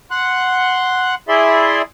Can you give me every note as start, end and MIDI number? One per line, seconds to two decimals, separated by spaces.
0.11 1.15 78
0.11 1.15 84
0.11 1.15 90
1.28 1.82 64
1.28 1.82 68
1.28 1.82 74
1.28 1.82 76
1.28 1.82 84